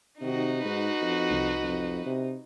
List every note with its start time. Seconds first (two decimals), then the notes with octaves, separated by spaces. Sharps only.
0.21 C3 D#3 D#4 F#4
0.64 G#2 F#4 B4
1.02 F2
1.31 C2
1.62 F2
2.05 C3